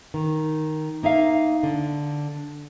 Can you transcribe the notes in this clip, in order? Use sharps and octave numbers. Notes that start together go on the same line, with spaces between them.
D#3
A#3 D#4 E5 F5
D3